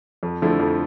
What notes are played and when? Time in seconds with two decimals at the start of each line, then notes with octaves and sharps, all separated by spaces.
0.23 F2
0.42 D3 F3 A3 E4
0.59 F2